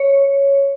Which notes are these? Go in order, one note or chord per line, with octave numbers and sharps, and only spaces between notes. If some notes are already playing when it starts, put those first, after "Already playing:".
Already playing: C#5